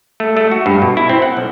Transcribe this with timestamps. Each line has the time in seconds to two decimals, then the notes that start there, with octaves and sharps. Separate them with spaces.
0.20 A3
0.37 A3
0.51 F#4
0.66 G2
0.82 B2
0.97 E4
1.09 C4
1.22 F#5
1.37 B1